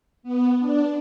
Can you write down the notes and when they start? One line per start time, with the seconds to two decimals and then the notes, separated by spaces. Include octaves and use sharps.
0.23 B3
0.59 D4